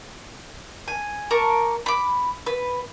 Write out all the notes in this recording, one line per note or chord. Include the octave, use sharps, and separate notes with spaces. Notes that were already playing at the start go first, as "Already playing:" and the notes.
G#5
A#4 A5 C#6 D6
B5 D6
B4